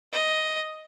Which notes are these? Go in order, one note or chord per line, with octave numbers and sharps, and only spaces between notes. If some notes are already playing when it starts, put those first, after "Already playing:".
D#5